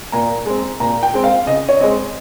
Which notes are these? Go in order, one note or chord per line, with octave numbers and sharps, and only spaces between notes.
A#2 A#5
G#3 C4
A#2 A#5
G5
G#3 C4
F5
C#3 D#5
C#5
G#3 C4 D#5